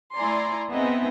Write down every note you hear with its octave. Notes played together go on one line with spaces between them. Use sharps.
A3 E4 D5 G#5 A#5 C6
B3 C4 D#4 G#4 D#5 E5